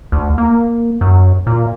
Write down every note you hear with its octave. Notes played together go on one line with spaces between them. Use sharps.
D2
A#3
F#2
A#2